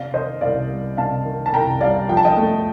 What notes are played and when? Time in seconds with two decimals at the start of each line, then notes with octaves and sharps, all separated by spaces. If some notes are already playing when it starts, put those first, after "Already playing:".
Already playing: C3 D5 F5
0.13 D#3 C5 D#5
0.41 C2 D5 F5
0.70 G3
0.97 C3 F5 A5
1.25 D#3
1.46 A5
1.53 C2 G5 A#5
1.81 G3 D5 F5
2.09 F3 G5
2.17 A5
2.25 D#5 G5
2.37 A3